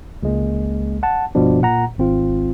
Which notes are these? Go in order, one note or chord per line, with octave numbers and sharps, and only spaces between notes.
C#2 G#3 A#3
F#5 A5
G1 G2 B2 F3 D4
A#2 F#5 A#5
G#1 C4 F4